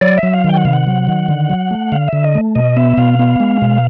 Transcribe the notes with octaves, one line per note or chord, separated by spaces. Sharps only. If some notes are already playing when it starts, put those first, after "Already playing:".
F#3 D5
E5
F#3
F5
D#3
G5
F#5
C3 F5
F#5
F#3
D#3
D3
F#3
A3
D3 F5
D3 E5
D#5
A3
B2 D#5
B3 E5
B2 F5
B3
G#3
B2